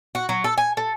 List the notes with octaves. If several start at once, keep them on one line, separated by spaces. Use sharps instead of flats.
F#4
F#3
A4
G#5
A4